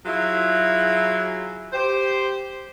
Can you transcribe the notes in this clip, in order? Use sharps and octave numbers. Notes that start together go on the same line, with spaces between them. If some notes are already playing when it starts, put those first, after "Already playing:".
F#3 E4 F4 G#4
G4 C5